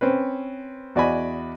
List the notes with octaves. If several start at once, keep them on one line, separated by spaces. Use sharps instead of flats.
C4 C#4 B4
E2 F#4 D5 D#5 G#5 B5